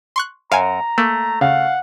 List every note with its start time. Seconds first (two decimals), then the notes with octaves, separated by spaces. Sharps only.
0.16 C6 C#6 F#6
0.52 F#2 F5 G#5 A#5
0.98 A3 A#3
1.41 C#3 F5 F#5